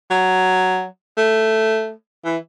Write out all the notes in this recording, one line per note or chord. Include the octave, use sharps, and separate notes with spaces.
F#3
A3
E3